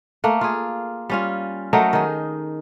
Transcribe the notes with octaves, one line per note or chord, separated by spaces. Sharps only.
A3 A#3
F4 G#4
G3 C#4 F4
F#3 A3 D#4 A#4
D#3 G#4